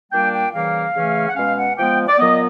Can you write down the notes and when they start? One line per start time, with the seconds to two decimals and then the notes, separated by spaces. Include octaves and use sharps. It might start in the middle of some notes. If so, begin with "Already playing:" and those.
0.12 A#2 G3 A#3 D4 G5
0.34 G5
0.53 C#3 E3 G3 A#3 F5
0.95 C#3 E3 A3 C#4
1.29 F#5
1.36 B2 G#3 C#4 F5
1.57 F#5
1.78 F3 G#3 B3 G5
2.08 D5
2.19 A#2 F#3 B3 D#5